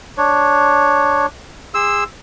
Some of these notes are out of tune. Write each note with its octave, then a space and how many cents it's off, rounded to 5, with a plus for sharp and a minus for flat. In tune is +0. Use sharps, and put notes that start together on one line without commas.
D4 +0 C#5 +0
G#4 -30 C6 +0 E6 +0